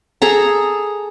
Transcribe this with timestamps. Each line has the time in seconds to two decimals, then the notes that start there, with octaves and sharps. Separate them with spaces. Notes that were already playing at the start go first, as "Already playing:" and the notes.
0.22 G#4 A4 A#5